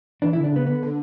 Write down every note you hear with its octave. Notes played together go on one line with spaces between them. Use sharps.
E3 D4
D3 E4
D4
C#3 B3
D3 B3
D3